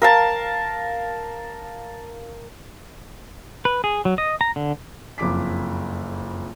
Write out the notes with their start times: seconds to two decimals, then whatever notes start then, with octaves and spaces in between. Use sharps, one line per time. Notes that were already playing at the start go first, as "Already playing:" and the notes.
0.02 A#4 F5 A5
3.65 B4
3.84 G#4
4.05 F#3
4.18 D#5
4.41 A#5
4.56 D3
5.18 F#1 F2 D6 B6